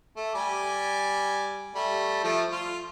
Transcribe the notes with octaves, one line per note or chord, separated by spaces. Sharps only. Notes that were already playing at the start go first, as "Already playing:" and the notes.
A3
G3 G#5 D6
G3 A3
F3 A3
F4